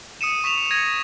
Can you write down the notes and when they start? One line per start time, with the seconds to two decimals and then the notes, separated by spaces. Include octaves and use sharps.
0.21 D#6 C#7 D#7 E7
0.44 C#6 B6 E7 F7
0.71 G#6 A#6 C#7 D#7